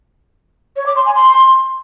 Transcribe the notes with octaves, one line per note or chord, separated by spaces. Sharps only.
C#5
D6
C6
G#5
C6